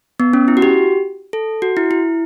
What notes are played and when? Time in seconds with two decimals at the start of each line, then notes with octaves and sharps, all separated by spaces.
0.20 B3
0.33 C#4
0.48 E4
0.57 F#4
0.62 G4
1.33 A4
1.62 F#4
1.77 E4
1.91 E4